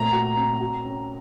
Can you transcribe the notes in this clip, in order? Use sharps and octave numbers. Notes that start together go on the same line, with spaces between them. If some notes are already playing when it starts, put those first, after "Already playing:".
Already playing: A#2 A3 C4 A#5
F#4
C4
F#4
C#4